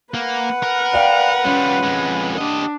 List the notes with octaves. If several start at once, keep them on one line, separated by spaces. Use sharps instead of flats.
A#3 B4 F#5
A#4
D5 F5 G5
G3 C#4 F4
F2 G#3
D4 G4 D#5